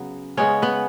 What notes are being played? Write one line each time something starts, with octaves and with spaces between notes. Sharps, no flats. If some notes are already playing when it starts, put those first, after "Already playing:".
Already playing: C#3 F#3 B3
C#3 G#3 B3 C#4 C#5
B3 B4